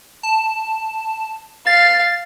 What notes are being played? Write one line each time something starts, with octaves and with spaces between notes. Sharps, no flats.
A5
F5 A6